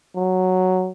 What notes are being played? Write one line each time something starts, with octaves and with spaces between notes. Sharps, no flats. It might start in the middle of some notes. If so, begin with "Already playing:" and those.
F#3